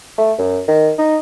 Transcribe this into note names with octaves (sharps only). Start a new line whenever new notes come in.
A3
F#2
D#3
D#4